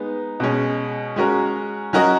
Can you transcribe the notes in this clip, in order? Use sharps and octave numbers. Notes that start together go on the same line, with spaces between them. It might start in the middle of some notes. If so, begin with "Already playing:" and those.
Already playing: G#3 B3 D#4
B2 G#3 C#4
G#3 C#4 F#4 A#4
F#3 C#4 F#4 A#4 D#5